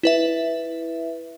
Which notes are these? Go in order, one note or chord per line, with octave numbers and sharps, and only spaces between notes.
E4 B4 E5